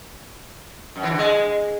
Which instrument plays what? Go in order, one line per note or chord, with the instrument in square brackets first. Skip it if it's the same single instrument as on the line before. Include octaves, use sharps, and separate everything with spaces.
[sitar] F#2
E3
D3
G#3